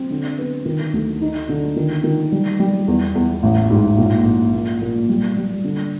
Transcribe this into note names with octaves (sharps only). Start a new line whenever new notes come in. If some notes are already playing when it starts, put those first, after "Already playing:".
Already playing: C4
D3
B3
D#3
D2
D#4
D3
D#3
D#3
G3
G3
E2
E2
A1
G#2
A#1
A#1
A#2
A#2
G3
G3
D3